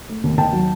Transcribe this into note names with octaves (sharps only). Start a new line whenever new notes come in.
A3
D#2
D#2 G5 A5
F#3